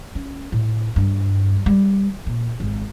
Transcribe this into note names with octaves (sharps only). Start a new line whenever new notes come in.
C#4
A2
G2
G3
A#2
G#1